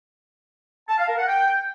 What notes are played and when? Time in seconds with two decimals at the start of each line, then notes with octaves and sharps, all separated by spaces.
0.89 A5
0.98 F5
1.08 A#4
1.17 F#5
1.27 G5